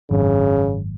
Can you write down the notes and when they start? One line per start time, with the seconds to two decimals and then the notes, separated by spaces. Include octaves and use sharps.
0.11 G#1 F#2 C#3